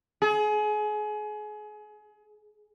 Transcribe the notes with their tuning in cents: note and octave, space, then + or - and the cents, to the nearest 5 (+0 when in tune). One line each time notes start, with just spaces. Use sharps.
G#4 +30